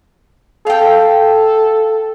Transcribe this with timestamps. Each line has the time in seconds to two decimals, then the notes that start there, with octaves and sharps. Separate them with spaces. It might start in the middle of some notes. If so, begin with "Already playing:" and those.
0.67 A4 F5 G5